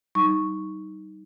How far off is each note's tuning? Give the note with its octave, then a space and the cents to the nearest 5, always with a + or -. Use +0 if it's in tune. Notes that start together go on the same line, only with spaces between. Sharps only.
G3 -35 D#4 +5 C#6 +0